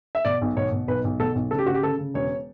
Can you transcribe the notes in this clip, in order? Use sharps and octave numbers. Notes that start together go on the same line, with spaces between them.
E5
B2 D5
B1
B2 C#5
B2
B1 B4
B1
B2 A4
B1
C#3 A4
G4
C#3 F#4
G4
C#3 A4
C#3
E1 C#5